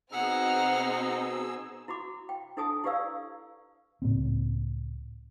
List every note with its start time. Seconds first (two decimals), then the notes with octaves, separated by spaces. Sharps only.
0.12 B2 C4 D#4 G#4 F#5 E6 F6
1.88 E4 F#4 B5 D6
2.29 G5
2.57 D4 E4 A4 G#5 A5 D#6
2.84 E4 G4 B4 D5 F5 E6
4.02 C#2 A2 A#3 C4